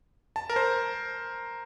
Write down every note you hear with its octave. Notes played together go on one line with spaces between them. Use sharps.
A5
A#4
C5